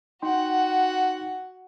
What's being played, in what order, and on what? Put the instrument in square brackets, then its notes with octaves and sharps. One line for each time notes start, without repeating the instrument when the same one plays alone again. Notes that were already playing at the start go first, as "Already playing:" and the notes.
[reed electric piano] D#4 G5 C6 [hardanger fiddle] F#4 F#5